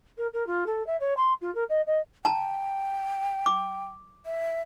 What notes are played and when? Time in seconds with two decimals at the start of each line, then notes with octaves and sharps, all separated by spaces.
0.17 A#4
0.33 A#4
0.46 F4
0.66 A4
0.86 E5
1.00 C#5
1.17 C6
1.41 F4
1.55 A#4
1.69 D#5
1.86 D#5
2.25 G5 A5 A#5
3.46 D6
4.26 E5